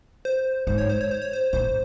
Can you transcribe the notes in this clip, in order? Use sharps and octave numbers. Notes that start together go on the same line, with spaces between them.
C5
G#2 C5
C#5
C5
C#5
C5
C#5
C5
A2 C5